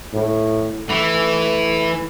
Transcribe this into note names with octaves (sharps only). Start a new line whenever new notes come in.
A2
E3 A3